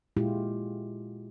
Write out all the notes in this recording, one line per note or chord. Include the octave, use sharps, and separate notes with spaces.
A#2 G#3 E4 F4 G4